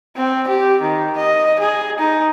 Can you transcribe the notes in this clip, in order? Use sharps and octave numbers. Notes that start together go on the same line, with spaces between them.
C4
G4
D#3
D#5
G#4
D#4